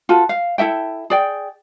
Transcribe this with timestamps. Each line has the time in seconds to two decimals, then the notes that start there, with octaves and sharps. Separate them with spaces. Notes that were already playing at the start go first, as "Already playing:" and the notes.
0.09 F4 F#4 A4
0.29 F5
0.58 E4 A4 E5 G5
1.10 G#4 D5 G5